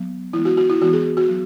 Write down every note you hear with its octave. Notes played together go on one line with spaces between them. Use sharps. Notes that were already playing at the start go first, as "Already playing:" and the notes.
Already playing: F#3 B3
E3 G#3 B3 E4
F#4
F#4
E4
E3 G#3 B3 F#4
G#4
F#4
F#3 B3